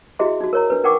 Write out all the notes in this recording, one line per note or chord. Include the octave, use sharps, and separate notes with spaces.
E4 F#4 G#4 D#5 E5 C6
D#4 F#4
A#4 C#5 A#5
D4 B4
D#4 A#4 F#5 G5 C#6 D6